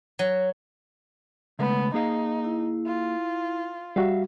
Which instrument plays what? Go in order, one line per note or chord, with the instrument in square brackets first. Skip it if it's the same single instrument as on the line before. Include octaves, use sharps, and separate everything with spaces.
[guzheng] F#3
[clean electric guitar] C#3 G#3 A3 [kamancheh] B3
[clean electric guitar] A#3 G#4 F5 [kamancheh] D#4
[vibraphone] E4
[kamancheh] F4
[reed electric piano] G3 F#4 [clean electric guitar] E5 F5